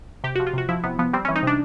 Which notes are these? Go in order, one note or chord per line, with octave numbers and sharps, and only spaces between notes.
C3 G4
F3 F#4
F4
C3 F#4
F3 E4
C3 B3
F3 B3
G3 C4
E3 C#4
D#4
C3 D4